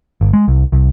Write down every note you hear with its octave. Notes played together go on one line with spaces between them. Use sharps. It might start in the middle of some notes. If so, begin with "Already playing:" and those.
G1
G#3
C2
C2